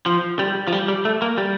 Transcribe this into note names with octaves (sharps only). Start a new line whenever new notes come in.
F3
G3
F3
G3
G3
A3
A#3
G3